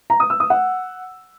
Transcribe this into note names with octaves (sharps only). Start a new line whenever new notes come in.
A#5
D#6
E6
D#6
F#5